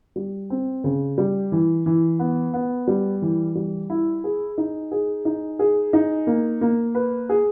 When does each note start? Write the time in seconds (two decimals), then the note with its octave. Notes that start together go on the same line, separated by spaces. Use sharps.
0.16 G3
0.50 C4
0.84 C#3
1.18 G3
1.52 E3
1.86 E3
2.19 B3
2.54 B3
2.87 G3
3.22 E3
3.55 G3
3.90 E4
4.24 G#4
4.58 D#4
4.91 G#4
5.25 D#4
5.59 G#4
5.93 D#4
6.27 A#3
6.61 A#3
6.95 B4
7.29 G#4